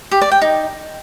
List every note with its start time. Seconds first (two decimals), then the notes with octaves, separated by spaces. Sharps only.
0.11 G4
0.21 D5
0.31 G5
0.42 D#4